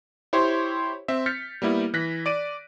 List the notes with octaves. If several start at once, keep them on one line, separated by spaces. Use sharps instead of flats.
E4 G4 C5 C#5 C6
C4 E5
F6 G6 A6 B6 C#7
G3 A#3 B3 E4
E3 F#6 A#6 B6
D5 D7 D#7